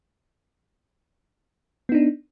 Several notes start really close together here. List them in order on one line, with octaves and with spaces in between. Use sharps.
B3 D#4 D4